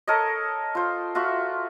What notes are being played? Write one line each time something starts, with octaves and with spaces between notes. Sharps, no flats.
A4 A#4 C#5 D#5
F4 C5
F4 F#4 E5